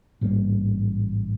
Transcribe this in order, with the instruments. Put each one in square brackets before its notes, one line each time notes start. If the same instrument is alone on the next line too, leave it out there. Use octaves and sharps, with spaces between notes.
[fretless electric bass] A1 G#2 G3 A#3